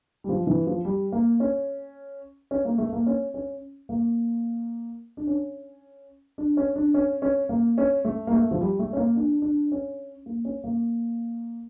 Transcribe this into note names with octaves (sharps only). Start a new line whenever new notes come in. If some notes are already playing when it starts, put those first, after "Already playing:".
G3
F3
E3
F3
G3
A#3
C#4
C#4
A#3
A3
A#3
C#4
C#4
A#3
D4
C#4
D4
C#4
D4
C#4
C#4
A#3
C#4
A3
A#3
A3
F3
G3
A3
C#4
A#3
D4
D4
C#4
A#3
C#4
A#3